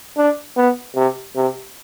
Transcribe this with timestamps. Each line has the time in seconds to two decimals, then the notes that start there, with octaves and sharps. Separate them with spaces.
0.17 D4
0.57 B3
0.96 C3
1.36 C3